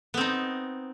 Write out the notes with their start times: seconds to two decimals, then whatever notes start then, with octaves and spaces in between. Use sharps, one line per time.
0.14 B3
0.17 C4
0.21 D#4